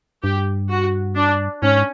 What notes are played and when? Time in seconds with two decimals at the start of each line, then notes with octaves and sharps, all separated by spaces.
0.23 G2 G4
0.70 F#4
1.15 D4
1.62 G#2 C#4